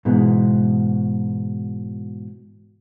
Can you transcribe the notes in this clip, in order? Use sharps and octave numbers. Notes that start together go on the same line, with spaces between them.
G#2 B2 E3 G#3